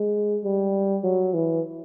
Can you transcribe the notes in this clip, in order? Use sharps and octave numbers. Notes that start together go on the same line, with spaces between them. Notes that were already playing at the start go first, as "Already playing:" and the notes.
Already playing: G#3
G3
F#3
E3